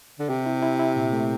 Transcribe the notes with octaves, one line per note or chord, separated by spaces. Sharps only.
D3
C3 G4
E4
E4
E4
A#2
A3